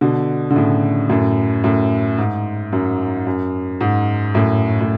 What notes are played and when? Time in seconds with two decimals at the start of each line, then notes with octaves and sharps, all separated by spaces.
0.01 B2 D3
0.51 D3
0.56 A2 C#3
1.09 F#2 A2
1.64 F#2 A2
2.18 G#2
2.73 F#2
3.27 F#2
3.81 G#2
4.34 F#2 A2
4.81 A2